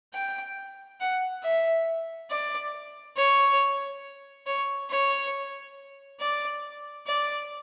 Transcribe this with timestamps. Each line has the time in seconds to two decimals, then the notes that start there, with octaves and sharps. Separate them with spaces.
0.13 G5
1.00 F#5
1.43 E5
2.30 D5
3.17 C#5
4.47 C#5
4.89 C#5
6.20 D5
7.07 D5